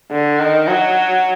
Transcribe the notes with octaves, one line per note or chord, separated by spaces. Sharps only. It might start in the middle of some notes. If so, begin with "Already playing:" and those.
D3
D#3
F#3